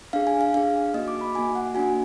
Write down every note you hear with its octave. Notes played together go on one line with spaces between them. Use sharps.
D4 G#4 F5
G#5
F5
D4 G#4 F5
A#3 D#4 F#4 D#5
D6
B5
A#3 D#4 F#4 G#5
F#5
A#3 D4 F#4 G#5